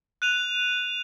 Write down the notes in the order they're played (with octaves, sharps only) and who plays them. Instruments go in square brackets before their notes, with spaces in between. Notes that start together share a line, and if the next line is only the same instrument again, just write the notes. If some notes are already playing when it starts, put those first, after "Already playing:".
[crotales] F#6 D#7 F7